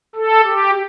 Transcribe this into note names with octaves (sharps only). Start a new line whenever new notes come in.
A4
G4